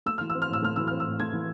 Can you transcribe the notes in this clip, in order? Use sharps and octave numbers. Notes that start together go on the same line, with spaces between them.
A3 E6
E3 F6
E6
C4
F6
A2 E6
A3 F6
E3 E6
C4 F6
E6
A2
A3 G#6
E3